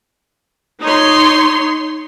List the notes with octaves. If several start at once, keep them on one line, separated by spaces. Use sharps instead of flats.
D#4 C#5 C6